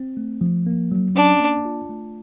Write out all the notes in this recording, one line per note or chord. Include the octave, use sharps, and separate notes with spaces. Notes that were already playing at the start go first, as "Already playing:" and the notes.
Already playing: C4
A3
F3
A#3
F#3
C#4 D4
A#3
F4
A3